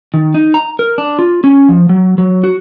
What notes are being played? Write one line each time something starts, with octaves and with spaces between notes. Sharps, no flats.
D#3
D#4
A#5
A#4
D4
F4
C#4
F3
F#3
F#3
F#4